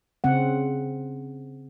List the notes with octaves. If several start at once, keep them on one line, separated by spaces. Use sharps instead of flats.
C#3 C4 F#5